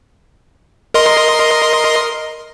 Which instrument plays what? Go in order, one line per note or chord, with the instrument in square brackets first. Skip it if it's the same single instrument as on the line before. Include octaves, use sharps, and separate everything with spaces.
[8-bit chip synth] A#4 D#5 C6